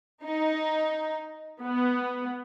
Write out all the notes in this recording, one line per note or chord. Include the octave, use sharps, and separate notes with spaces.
D#4
B3